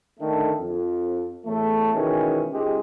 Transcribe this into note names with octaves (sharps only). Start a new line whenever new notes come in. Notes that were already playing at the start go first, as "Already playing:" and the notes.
D3 D#3 A3
F2
E2 A2 A3
B2 D#3 E3 G#3 C#4
C#2 G#2 G#3 G4